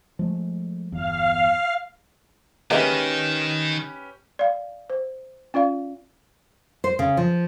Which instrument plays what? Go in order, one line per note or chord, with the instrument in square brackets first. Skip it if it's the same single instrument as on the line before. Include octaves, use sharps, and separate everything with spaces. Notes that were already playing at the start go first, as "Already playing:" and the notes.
[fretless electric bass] F3 G#3 A3
[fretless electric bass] G1 E2 [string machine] F5
[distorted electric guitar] D#3 [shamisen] G#3 A#3 E4 [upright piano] C#4 G4 B4
[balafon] D5 F5
C5
C#4 F4 D5 F5
[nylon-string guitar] C5
C#3
F3